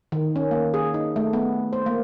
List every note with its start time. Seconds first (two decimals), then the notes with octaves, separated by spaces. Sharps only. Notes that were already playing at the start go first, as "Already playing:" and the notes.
0.12 D#3
0.36 C#4
0.51 A#3
0.74 G#4
0.94 D#4
1.16 A3
1.33 B3
1.73 C5
1.86 A#3